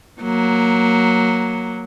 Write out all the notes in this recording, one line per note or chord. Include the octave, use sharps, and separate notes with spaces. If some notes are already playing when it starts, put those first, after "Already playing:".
F#3 A#3